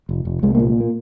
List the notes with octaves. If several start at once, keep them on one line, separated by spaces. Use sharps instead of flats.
F1
F1
C2 G#3
A#3
A#2
A#3